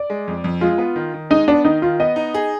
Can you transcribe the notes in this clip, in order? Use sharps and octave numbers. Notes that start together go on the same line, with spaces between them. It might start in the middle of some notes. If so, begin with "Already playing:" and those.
Already playing: D5
G#3
F2
F2
G#3 F4
B3
D#3
D#3
G#3 D#4
B3 D4
D#3 D#4
D#3 F4
B3 D#5
D#4
G#4